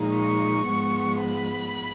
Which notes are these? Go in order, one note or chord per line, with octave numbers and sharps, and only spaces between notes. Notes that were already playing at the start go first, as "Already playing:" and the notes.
Already playing: A#2 F3 G#3 D#4
C#6
G#2 F3 G#3 B3
B5